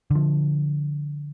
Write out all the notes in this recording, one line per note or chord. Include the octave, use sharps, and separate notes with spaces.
D3 F3